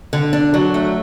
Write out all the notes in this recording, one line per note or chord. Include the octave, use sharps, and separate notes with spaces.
D3
D4
F#3
A3